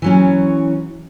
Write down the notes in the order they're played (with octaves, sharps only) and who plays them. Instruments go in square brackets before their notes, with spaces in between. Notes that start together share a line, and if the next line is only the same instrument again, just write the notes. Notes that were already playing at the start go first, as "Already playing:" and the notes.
[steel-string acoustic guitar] E3 F#3 C#4